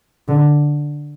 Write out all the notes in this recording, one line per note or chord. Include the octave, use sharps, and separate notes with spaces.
D3